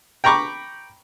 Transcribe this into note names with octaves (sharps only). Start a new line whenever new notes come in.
G5 A#5 B5 C#6 D6